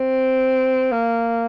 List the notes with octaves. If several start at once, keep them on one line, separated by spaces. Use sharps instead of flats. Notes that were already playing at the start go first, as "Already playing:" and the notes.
Already playing: C4
A#3